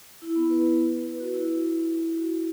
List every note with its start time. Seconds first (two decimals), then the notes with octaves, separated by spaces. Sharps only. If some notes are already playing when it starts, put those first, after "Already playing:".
0.22 E4
0.36 B3
0.50 B4
1.06 B4
1.20 F#4
1.34 E4
2.19 F#4